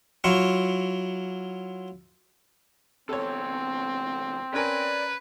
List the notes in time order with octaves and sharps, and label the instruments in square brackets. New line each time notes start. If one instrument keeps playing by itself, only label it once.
[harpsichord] F#3 E4 F4 C#6
[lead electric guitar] E2 C3 [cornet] C4 [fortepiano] A4 C#5
[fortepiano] C#4 A#4 G#5 [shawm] B4 [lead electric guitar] D5